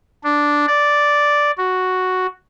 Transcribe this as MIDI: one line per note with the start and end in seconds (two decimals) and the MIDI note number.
0.24 0.66 62
0.67 1.51 74
1.58 2.26 66